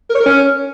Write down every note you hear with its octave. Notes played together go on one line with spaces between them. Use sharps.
A#4
C#5
A#4
C#4